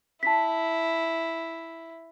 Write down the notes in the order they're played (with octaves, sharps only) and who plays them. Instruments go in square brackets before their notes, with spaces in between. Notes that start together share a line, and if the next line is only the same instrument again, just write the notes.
[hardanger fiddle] E4 [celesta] A5 B6